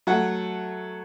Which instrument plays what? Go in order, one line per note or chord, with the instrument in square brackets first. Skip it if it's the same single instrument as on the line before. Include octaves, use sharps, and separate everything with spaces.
[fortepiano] F#3 A3 F#5